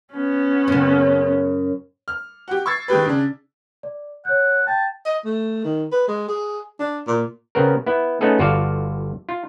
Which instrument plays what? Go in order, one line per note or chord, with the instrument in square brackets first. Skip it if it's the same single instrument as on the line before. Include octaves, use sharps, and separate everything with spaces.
[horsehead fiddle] B3 C#4
[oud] F#2 C#3
[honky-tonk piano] F6
F#4 G4
C#6 E6 G#6 A6 C7
D#3 G#3 G4 B4
C#3 D4
[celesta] D5
[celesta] C#5 G6 [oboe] F#5
[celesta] G5 G6 [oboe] A5
[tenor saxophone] D#5
A3
D#3
B4
G#3
G#4
D4
A#2
[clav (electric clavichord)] C#3 B3 C4 A#4
B3 E4
A3 B3 C#4 D#4 G#4 A4
G1 F4 F#4 A4 D5 F5
F4